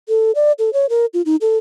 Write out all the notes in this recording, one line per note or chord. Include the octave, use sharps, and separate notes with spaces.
A4
D5
A4
C#5
A#4
F4
D#4
A4